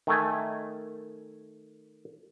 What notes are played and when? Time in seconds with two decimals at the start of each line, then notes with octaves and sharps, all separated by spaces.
0.07 D#3 A3 G#5